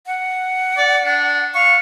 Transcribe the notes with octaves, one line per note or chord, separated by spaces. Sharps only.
F#5
D5
D4
F5 C#6